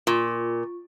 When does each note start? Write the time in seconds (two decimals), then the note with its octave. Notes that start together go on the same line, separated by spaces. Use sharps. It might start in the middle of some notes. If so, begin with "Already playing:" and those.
0.07 A#2 F4 C#6